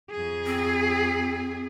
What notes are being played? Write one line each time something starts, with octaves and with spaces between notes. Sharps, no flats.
F2 G#4
C4